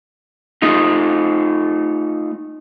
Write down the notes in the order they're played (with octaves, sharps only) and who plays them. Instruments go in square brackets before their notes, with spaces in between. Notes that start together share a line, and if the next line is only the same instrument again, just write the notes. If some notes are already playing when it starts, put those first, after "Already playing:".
[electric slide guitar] A3 D#4 F4